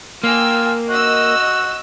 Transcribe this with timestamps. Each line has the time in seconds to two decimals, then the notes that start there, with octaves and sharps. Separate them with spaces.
0.24 A#3 F4 G5 G#5 E6
0.90 F#4 D#5 E6